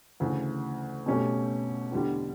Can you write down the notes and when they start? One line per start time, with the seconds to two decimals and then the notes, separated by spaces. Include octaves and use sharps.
0.20 D2 C#3 E3
1.06 B2 F#3 A3 C#4 G4
1.92 E2 D3 G3